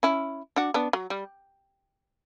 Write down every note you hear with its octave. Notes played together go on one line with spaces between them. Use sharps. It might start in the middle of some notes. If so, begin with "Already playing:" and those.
C#4 E4
D4 F#4
B3 D4
F#3
G3